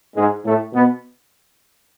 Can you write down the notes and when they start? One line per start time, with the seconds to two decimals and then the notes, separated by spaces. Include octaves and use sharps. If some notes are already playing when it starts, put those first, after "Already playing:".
0.16 G#2 G#3
0.45 A2 A3
0.73 B2 B3